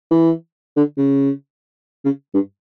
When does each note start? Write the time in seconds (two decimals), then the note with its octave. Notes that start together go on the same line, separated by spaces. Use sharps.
0.11 E3
0.76 D3
0.98 C#3
2.05 C#3
2.34 G2